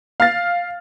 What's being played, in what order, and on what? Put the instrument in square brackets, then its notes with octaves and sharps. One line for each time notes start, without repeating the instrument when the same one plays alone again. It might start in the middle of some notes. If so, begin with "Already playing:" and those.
[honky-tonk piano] F5 F6 A6